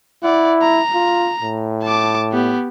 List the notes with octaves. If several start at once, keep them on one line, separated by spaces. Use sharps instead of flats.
E4 D5 F#5
A#5
F4
A2
A5 D6
B3 G4